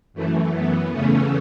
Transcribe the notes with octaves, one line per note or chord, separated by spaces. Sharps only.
F#2 E3 A3
B3
E2 C#3 E3 A3 C#4